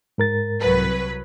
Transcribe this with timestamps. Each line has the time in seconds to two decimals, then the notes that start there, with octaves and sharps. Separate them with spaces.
0.18 G#2 A#4 A6
0.61 C2 F#3 B4